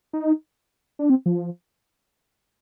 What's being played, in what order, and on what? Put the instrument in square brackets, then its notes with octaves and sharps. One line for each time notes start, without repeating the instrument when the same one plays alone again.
[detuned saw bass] D#4
D4
C4
F3